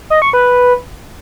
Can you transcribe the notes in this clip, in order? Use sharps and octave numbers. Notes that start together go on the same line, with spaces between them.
D#5
C#6
B4